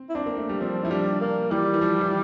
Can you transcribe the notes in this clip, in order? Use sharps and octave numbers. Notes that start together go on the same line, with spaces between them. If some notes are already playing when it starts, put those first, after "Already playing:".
Already playing: C4
E4
C4 D4
A#3
A3
G3
F3 C4
F3 E4
G3 D4
A#3
E3 G3
E3
F3
E3